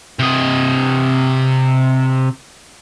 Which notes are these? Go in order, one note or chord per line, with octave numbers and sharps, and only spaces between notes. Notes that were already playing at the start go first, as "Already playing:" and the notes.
C3 D#5